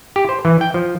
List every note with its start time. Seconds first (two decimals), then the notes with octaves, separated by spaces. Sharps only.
0.16 G4
0.29 C5
0.45 E3
0.61 G5
0.74 F3